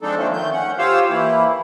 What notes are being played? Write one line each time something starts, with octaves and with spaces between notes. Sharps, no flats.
F3 G#3 C4 D4 D#4 A4
D3 F3 A3 A#3 C4 C#4
D#3 A3 G6
C#4 F#5
F4 G4 C5 C#5 F5 E6
E3 A#3 E4